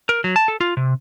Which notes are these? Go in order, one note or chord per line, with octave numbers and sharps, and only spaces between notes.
A#4
F#3
A5
A4
F4
C3